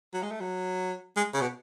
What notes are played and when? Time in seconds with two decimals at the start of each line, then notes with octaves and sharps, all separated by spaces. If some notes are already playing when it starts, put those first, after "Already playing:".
0.14 F#3
0.23 G#3
0.31 A3
0.40 F#3
1.16 G#3
1.34 C#3
1.41 B2